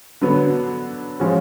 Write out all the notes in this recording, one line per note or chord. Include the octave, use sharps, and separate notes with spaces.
D3 F#3 B3
F3 G#3 C#4 F#4